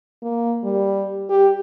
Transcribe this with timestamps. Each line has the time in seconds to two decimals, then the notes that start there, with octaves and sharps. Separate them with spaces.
0.23 A#3
0.64 G3
1.29 G4